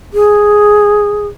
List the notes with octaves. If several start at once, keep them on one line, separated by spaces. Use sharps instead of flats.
G#4